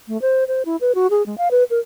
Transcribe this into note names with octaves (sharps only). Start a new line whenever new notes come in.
A3
C5
C5
E4
B4
F#4
G#4
G#3
F5
B4
A#4